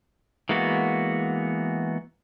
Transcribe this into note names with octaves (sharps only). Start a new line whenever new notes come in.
E3 G#3 A#3 B3 F#4